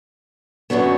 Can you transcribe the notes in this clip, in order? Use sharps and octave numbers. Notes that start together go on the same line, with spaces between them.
F#2 D3 F#3 B3